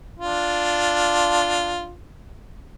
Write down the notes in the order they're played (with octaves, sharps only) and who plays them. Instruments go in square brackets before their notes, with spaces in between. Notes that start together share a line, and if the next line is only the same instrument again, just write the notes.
[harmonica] D4 F4